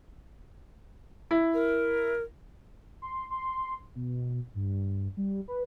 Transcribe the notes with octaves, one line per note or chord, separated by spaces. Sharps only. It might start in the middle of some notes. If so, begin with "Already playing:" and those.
E4
A#4
C6
C6
B2
G2
G3
B4